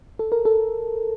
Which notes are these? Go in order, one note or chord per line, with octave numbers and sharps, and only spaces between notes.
A4
A#4
A4